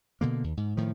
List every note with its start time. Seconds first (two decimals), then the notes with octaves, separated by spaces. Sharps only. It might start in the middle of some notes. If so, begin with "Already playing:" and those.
0.21 B2 D3 A#3
0.44 D#2
0.57 G#2
0.77 A2 D#3 F3